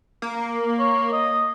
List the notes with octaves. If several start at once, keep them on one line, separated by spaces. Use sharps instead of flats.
A#3
C#5
D#5